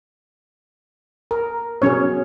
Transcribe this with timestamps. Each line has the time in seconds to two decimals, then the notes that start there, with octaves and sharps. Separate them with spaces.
1.31 A#4
1.82 B2 F#3 C#4 G#4 C#5